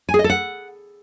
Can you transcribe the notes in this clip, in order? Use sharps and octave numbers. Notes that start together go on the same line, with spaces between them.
G#5
G#4
D#5
A4
F#5